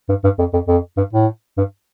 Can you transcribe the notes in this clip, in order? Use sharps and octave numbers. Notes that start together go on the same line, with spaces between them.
G2
G2
F2
F2
F2
G2
A2
G2